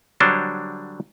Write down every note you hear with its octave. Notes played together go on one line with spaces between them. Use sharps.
D3 F#3 G3 D4 C5 C#5